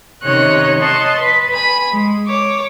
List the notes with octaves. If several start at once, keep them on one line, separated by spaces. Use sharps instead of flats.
C3 D#3 C#4 C#5 D#5 F#6
C#5 D#5 A5 C6 F#6
B4
G#5 B5
G#3
C#5 D6